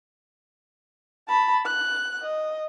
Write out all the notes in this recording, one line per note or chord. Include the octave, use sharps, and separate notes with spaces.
A5 B5
F#6
D#5